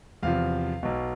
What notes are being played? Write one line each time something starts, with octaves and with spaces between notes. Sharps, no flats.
E2 C3 F3 F5
B1 B2